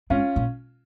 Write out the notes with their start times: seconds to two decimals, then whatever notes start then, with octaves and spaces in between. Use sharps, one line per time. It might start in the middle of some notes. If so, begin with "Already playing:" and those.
0.10 G#2 C#4 F4
0.36 A#2